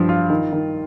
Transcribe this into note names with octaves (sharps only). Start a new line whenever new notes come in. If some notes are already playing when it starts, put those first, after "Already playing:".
Already playing: G2 F3
F4
D#3
D#3